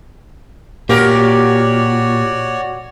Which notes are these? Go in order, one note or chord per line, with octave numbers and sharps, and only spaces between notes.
A#2 F#4 G4 A#4 C#5 D5